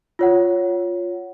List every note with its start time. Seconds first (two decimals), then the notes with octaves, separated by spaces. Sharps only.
0.19 F4 C#5 F#5